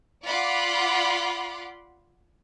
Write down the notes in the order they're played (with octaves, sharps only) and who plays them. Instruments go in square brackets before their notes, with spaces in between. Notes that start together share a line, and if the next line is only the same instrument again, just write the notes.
[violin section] F4 D5 F#5 B5 C6 D6